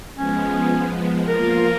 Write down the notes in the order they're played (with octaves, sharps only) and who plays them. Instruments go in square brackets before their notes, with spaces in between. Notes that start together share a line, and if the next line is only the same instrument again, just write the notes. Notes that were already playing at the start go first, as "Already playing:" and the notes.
[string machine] F3 G#3 B3 [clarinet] C#4
[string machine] F3 A#3 F4 [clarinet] A#4